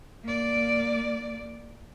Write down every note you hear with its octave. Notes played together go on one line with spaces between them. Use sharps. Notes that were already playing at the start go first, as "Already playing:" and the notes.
A#3 D5